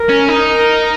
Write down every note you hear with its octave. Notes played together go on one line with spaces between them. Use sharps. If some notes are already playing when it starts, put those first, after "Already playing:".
Already playing: A#4
C#4
D#4
A#4